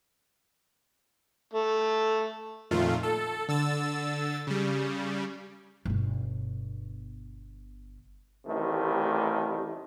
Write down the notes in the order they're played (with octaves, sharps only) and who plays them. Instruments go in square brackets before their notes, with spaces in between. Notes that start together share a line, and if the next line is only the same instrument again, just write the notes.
[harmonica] A3
[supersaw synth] F2 A#2 D#3 A3 F4
A4
D3 E6 A6
C#3 G3
[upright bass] G1 B2
[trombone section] A1 C3 D#3 G3 A3